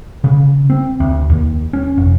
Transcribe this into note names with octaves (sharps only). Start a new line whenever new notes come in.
C#3
C4
D2
D#2
C#4
F1